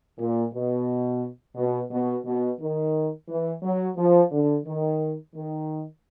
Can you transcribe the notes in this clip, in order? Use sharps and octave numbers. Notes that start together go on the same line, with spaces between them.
A#2
B2
B2
B2
B2
D#3
E3
F#3
F3
D3
D#3
D#3